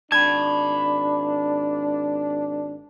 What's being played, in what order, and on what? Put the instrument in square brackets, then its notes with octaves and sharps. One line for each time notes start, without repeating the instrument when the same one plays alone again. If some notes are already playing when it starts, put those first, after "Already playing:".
[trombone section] G#1 D4 [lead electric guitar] A5 B5 [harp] G#6